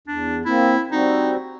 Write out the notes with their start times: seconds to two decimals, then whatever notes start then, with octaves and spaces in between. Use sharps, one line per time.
0.07 E2 D4
0.45 A#3 C4 E4
0.92 G3 C4 D#4 F#4